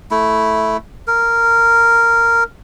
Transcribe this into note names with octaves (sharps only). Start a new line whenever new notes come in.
A3 E4
A#4